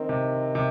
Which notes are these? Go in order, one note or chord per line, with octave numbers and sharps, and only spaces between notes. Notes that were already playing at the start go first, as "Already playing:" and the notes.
Already playing: D#3 C4
C3
C3